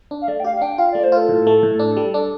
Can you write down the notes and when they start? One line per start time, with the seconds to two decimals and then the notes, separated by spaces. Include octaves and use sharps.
0.11 D4
0.22 F5
0.28 A3 D5
0.40 G5
0.44 G4 F5
0.56 F5
0.61 D4 G5
0.78 F4 F5
0.91 A3 D5
1.04 C5
1.12 F4 A4
1.29 A2
1.47 A3
1.63 A2
1.79 D4
1.97 G3
2.14 D4